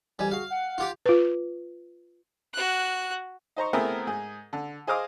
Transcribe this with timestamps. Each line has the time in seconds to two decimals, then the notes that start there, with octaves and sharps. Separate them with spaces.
0.19 F2 E3 G3 G#5
0.32 F#4 G#4 F5
0.50 F#5
0.78 F4 G4
1.06 F4 B4
2.54 F#4 F#6
3.56 D#4 C5 A#5 C#6
3.73 A3 B3 C4 E4 G#4 A#4
4.07 G#2 G#4
4.53 D3
4.87 G#4 C5 D#5 F5 D6 D#6